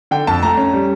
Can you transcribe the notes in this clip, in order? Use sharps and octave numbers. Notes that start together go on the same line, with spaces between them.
D3 G5
F2 A5
A3 A#5
C#4
G3